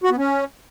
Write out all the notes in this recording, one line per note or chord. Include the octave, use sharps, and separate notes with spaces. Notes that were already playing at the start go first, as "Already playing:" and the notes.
F#4
B3
C#4